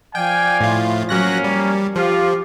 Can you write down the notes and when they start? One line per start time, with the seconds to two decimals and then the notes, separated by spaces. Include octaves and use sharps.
0.15 F3 D5 F5 G5 G#5
0.60 A2 F4
1.09 F#3 A#3 C#4 F#6 A#6
1.44 G3
1.96 F3 F4 G4